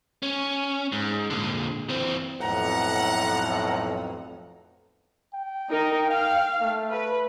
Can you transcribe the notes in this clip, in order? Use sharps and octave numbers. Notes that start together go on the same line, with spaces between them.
C#4
G#2
A#2 D3
E3 C4
B1 F2 A2 F#5 A#5
G5
D#4 A#4
F5 G5
A3
B4